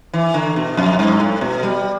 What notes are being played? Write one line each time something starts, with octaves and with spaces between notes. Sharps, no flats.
E3
D3
B2
F2
G2
A2
B2
G3